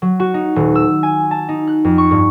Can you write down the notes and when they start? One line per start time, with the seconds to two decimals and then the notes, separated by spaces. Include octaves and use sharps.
0.02 F#3
0.20 F#4
0.34 D#4
0.56 D#1
0.75 E6
1.03 G#5
1.31 A5
1.49 D#4
1.67 F#6
1.85 F2
1.98 C#6
2.11 G2